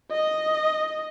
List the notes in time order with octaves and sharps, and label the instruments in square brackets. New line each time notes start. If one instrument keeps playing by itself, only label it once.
[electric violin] D#5